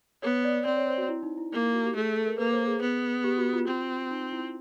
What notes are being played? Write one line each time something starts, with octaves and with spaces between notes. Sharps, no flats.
B3 C#5
D5
C4 D5
C#5
C5
F#4
E4
D#4
E4
A#3 E4
E4
F#4
G4
A3 G#4
G#4
A4
A#4
A#3 B4
C5
G#4
B3
G4
F#4
F4
C4
D#4
E4